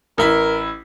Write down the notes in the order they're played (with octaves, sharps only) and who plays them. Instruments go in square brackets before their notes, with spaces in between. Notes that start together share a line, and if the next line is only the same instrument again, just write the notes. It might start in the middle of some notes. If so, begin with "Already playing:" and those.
[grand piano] A1 E4 B6 [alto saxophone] A#4